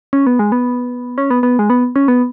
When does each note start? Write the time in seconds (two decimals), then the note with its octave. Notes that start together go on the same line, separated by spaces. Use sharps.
0.13 C#4
0.27 B3
0.39 G#3
0.52 B3
1.18 C#4
1.30 B3
1.43 B3
1.59 G#3
1.70 B3
1.96 C#4
2.08 B3